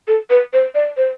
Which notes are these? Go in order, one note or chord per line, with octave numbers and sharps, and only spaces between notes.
A4
B4
C5
D5
C5